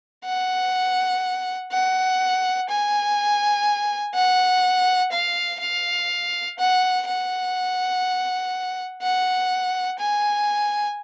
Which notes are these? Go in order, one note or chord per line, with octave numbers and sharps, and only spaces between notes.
F#5
F#5
G#5
F#5
F5
F5
F#5
F#5
F#5
G#5